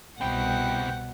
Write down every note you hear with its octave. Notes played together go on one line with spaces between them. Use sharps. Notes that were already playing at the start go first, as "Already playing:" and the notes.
C2 B2 C4 E4 F#5 G5